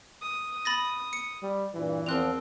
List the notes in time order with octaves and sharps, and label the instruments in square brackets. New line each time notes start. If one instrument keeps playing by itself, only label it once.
[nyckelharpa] D#6
[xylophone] B5 A6 A#6
C#7
[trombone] G3
[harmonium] G2 A#2 [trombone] E3
[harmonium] E2 F3 [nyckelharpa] C4 [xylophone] A#4 F#6 F7